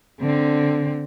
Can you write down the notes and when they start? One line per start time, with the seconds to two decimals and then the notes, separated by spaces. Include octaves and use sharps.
0.20 D3 C4